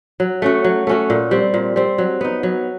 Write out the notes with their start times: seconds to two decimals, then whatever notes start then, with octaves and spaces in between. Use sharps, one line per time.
0.20 F#3
0.42 A3 C#4 F#4
0.64 F#3
0.87 A3 C#4 F#4
1.10 A#2
1.31 G3 C4
1.54 A#2
1.76 G3 C4
1.98 F#3
2.21 B3 D#4
2.43 F#3